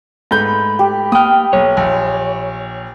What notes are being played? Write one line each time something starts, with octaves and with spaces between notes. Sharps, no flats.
G#2 A3 B4 B5 G6
G4
A#3 G5 D#6 F6
B1 C#5
A#1